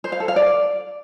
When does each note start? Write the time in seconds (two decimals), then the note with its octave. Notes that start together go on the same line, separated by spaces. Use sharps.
0.04 C5
0.12 F5
0.20 A4
0.28 F5
0.36 D5